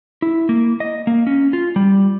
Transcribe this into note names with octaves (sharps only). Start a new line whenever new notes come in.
E4
A#3
D#5
A#3
C#4
F4
G3